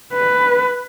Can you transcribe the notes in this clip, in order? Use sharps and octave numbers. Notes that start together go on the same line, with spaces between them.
B4